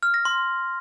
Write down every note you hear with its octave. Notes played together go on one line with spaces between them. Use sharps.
F6
A#6
C6